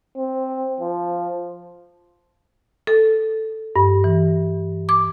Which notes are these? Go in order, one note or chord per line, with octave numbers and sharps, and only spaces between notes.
C4
F3
A4
G2
E3
D6